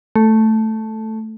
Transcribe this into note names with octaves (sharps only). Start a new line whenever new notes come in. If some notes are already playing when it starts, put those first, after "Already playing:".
A3